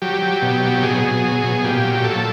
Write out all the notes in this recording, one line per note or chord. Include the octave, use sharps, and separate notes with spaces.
F#3 G4
F#3
B2
F#3
B2 G#4
B2
F#3
B2
A#2 G4
F#3
A#2 A4